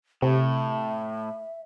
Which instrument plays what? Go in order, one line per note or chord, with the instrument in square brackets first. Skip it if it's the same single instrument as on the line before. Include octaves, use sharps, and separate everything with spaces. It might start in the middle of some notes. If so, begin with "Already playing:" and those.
[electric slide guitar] A2 [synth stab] C3 [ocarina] E5